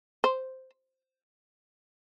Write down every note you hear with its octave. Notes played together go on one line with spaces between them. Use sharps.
C5